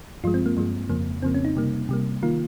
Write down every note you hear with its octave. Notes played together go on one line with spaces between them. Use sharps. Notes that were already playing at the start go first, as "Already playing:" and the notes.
G2 F3 G#3 F4
C4
A#3
G2 F3 G#3
F2 C#3 F3 A#3
F2 C#3 F3 A#3 C4
C#4
D#4
C3 G3 A#3
C3 G3 A#3
D#3 A#3 F4